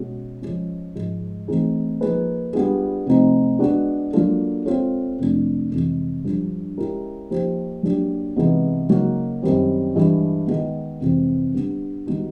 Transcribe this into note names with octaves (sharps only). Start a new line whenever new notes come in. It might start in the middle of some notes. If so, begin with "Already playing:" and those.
Already playing: B2 G#3 C#4 F#4
F3 G#3 C#4
G#2 F3 G#3
E3 A3 C4 D#4 G#4
F3 A#3 D#4 G#4 B4
G3 B3 D4 F4 G#4
C3 F3 A3 C4 D#4
G#3 B3 D4 F#4
F#3 A#3 D4 F4 A4
G#3 C4 F4 A4 C#5
F2 C3 F3 A3 D4
F2 C3 E3 G#3
G2 D3 F3
G#3 C#4 E4 G4 A#4
F3 A#3 D#4 G4 C5
F#3 A#3 D4 G4
C3 E3 G#3 B3 D#4
C#3 F#3 A#3 D#4 F#4
F#2 D#3 G3 C4
G2 E3 G#3
D#3 G#3 B3
F2 C3 E3 G#3 C4
D3 G3 B3
D#3 G3 B3 D#4 F#4